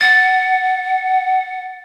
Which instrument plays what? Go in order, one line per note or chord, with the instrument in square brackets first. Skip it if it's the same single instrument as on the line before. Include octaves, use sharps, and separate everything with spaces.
[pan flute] F#5 [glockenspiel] A6